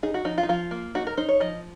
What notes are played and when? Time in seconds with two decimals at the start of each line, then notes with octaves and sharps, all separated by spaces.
0.03 D#4 G#4
0.14 F#4
0.25 F3 D#4
0.38 F4
0.43 D#4
0.49 F3 F4
0.71 A#3
0.95 D#4 F#4
1.07 A#4
1.17 D#4 C5
1.28 C#5
1.40 F3 D#5